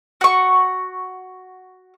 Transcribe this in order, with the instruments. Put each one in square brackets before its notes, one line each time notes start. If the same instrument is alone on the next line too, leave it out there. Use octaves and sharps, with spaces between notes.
[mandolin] F#4 C#6